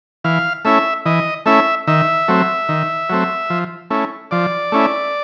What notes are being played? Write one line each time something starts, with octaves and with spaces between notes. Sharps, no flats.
E3 F5
A3 C#4 E4 E5
E3 D#5
A3 C#4 E4 E5
D#3 E5
F#3 A3 C4
D#3
F#3 A3 C4
F3
A3 C#4 E4
F3 D5
A3 C#4 E4